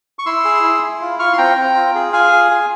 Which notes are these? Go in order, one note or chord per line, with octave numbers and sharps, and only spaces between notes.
C#6
E4 C6 E6
G#4
E4
E4
F4
F4 C#6 F6
C6
C4 G5 A#5
C4
F4
G#4
F4 F5 G#5
G#4
G#4